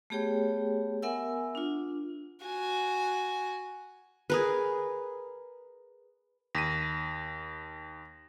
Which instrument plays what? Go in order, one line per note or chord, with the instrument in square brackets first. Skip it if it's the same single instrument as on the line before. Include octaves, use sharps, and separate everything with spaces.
[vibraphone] A3 B3 G4 G#4 C#5 G5
B3 A#4 E5 F#5 G#5 E6
D4 F4
[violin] F#4 G#5
[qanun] G#4 A#4 B4
[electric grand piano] D#2 B6 D#7 [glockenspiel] A#6